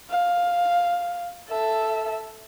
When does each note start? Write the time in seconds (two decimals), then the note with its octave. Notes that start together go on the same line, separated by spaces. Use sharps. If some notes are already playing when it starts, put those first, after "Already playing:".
0.10 F5
1.49 A4 E5